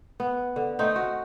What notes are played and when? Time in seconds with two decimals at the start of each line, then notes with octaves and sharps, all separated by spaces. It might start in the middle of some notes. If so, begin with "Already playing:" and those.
0.20 B3
0.56 D3
0.79 A3 C4 D#4
0.96 F#4